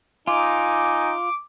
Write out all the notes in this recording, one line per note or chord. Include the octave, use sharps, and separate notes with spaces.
D#4 F4 G#5 D6